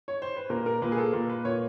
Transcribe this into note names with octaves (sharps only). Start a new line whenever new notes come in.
C#5
C5
B4
A#2 A#4
A#4
A#2 B4
G#4
A4
A#2 A#4
B4
A#2 C#5